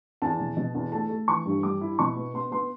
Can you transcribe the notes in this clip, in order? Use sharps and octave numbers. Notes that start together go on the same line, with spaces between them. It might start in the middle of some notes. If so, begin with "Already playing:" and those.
E2 A5
B2
B2
E2
A3 A5
A3
E3 C#6
G2
G3 D6
E4
B2 C#6
B3
B3 C6
B3 C6